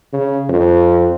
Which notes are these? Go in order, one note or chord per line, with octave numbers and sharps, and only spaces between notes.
C#3
F2